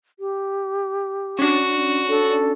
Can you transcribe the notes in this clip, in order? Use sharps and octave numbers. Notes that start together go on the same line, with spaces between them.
G4
C#4 D4 F#4
A4